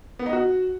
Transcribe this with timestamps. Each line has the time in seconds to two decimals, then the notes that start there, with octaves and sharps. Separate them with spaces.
0.19 B3
0.26 D#4
0.33 F#4